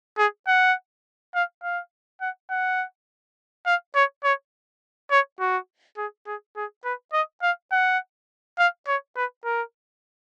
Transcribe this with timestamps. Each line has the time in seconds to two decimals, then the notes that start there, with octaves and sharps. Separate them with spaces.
0.18 G#4
0.48 F#5
1.35 F5
1.63 F5
2.21 F#5
2.50 F#5
3.66 F5
3.95 C#5
4.24 C#5
5.11 C#5
5.40 F#4
5.97 G#4
6.27 G#4
6.56 G#4
6.85 B4
7.13 D#5
7.43 F5
7.72 F#5
8.59 F5
8.87 C#5
9.16 B4
9.45 A#4